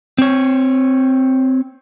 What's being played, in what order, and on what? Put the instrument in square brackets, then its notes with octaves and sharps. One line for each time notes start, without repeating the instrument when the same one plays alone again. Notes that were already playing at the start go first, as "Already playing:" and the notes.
[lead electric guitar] C4 C#5